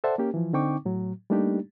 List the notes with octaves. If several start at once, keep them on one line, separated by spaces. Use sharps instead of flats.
A4 C5 D5 E5 F#5 A5
A#3 C#4 G4
E3 F3
D3 C4 D#4 G5 C#6 D6
A2 F#3
G3 A3 A#3 D4 D#4 G4